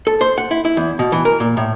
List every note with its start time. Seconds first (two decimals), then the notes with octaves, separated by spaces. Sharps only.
0.07 A4
0.21 C5
0.38 F#5
0.51 E4
0.65 E4
0.77 E2
0.99 B2
1.12 E3
1.25 A#4
1.40 A#2
1.57 A2